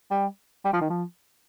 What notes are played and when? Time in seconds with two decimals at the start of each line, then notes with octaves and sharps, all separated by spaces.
0.10 G3
0.64 G3
0.73 F3
0.81 D#3
0.89 F3